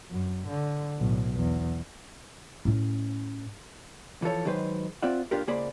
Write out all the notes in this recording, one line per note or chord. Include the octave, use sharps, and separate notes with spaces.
F#2
D3
B1 A2
E2
A2 C#4
E3 F3 A4 C#5
D#3 F#3 G#3 B4 C5
C4 F4 D5 E5 F#5
A#2 D4 F4 G4 A#4
C#2 A#3 G#4 C5 D5 B5